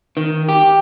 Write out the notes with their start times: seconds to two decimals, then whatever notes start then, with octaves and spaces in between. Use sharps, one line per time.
0.17 D#3
0.49 G4